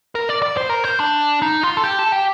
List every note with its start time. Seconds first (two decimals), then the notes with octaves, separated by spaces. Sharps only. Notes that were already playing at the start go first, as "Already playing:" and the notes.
0.15 A#4
0.29 D5
0.42 D5
0.57 C5
0.69 A#4
0.84 C5
1.00 D4
1.42 D#4
1.63 F4
1.77 A4
1.84 G4
1.99 A4
2.12 G4